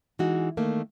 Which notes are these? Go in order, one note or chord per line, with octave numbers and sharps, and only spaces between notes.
E3 G#3 D#4 F#4
D#3 A3 A#3